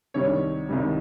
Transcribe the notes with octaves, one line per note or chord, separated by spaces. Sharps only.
C2 C3 D#3 G3 C#5
C2 C3 D#3 G3